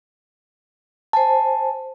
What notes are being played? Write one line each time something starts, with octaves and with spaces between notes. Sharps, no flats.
C5 G#5 A5